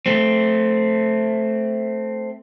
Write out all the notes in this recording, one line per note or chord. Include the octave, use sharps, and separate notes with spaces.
A3 C4